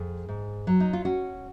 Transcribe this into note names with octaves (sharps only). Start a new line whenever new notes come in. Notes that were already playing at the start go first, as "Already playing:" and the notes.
Already playing: F2 G#4
G#2
F#3
D#4
F4
C#4 F#4